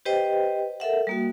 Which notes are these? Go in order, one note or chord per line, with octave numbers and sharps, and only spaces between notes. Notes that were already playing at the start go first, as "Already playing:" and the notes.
G4 B4 C5 D#5 G5
A4 A#4 E5 F#5
G3 A#3 F#4